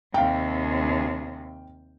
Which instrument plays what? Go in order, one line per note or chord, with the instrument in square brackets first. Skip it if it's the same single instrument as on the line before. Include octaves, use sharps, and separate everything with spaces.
[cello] D#2 C3 [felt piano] F5 G5